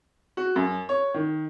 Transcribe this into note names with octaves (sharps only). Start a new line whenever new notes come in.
F#4
F#2
C#5
D#3